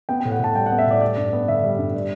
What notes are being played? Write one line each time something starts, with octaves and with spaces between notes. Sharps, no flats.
B3 G5
G5
A2
F#5
A2 A5
G3 G5
F#5
B3
E5
A2 D5
G3 D5
G2
B3
D3 E5
G3
G2
G3